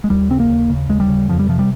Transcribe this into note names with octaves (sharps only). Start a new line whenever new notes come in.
G#3
D#2 G3
C#3 C4
A#3
D#2
C#3
D#2 G#3
G3
C#3
F2 F3
G3
C3 F3
G3